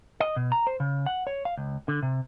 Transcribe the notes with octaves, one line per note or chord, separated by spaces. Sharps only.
D#5
B2
A#5
C5
C#3
F#5
C#5
F5
C#2
D3
C3